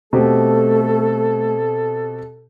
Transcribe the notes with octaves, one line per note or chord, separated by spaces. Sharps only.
B2 A3 C4 G4 A4